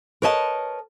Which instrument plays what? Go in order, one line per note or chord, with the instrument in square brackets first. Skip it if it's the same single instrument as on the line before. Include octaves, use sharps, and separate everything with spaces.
[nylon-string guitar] A#4 B4 C#5 D#5 F#5 A5